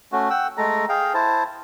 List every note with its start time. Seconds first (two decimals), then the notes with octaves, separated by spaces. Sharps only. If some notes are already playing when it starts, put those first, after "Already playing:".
0.12 A3 C#4 F#4
0.30 F#5 G5 E6
0.58 G#3 A3 A4 A#5
0.89 G#4 F5 G5
1.14 E4 C5 A5